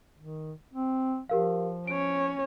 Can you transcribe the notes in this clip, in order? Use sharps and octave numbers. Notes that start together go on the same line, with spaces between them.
D#3
C4
F3 G4 A#4 F5
C#4 C#5 D7